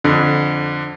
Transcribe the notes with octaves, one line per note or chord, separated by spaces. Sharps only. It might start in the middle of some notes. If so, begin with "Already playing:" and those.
F2 D3